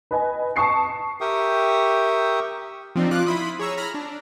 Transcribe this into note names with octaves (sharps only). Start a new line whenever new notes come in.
B4 D#5 G#5
A5 C#6 D#6 C7 C#7
G4 A#4 E5 G5 C#6 D#6
F3 C4 D4 D#4
F3 F4 D6 F#6
E4 B5 C6 D#6
G#4 C#5 A#5 E6
A#5 B5 F6 A#6
D4